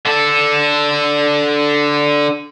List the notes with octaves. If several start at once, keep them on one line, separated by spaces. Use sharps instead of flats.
D3 A4